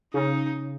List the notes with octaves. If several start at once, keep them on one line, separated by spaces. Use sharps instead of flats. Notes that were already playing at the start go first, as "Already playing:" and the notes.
C#3 D#4